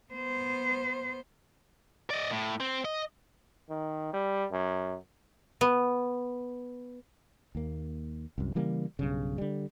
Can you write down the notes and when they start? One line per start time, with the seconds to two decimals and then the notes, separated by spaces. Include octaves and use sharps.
0.13 B3 C5
2.10 D5 D#5
2.31 A2
2.60 C4
2.85 D#5
3.69 D#3
4.13 G3
4.51 F#2
5.61 B3
7.55 D#2 A#3
8.38 C2 F#2
8.55 C#3 E3 G3 A#3
8.99 B1 G2 C#3
9.38 D3 G3